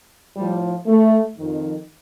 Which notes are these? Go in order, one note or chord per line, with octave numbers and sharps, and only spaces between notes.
A2 F3 G3
A3
F2 D#3